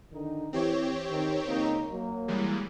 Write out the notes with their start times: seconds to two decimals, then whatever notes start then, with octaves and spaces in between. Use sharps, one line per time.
0.12 D3 D#3 D#4
0.53 E3 C4 G4 C#5
1.10 D#3
1.47 C#2 A#3 D#4
1.90 F#3 A#3
2.28 E3 G3 G#3